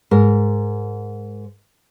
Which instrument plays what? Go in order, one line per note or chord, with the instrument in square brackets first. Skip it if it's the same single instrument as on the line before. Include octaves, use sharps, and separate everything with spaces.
[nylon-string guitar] G#2 A#4